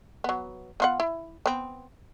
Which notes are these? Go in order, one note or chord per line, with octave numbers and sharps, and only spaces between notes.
F#3 B3
B3 F4 F#5
E4
B3 C4